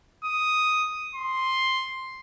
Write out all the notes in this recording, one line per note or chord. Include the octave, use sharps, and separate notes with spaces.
D#6
C6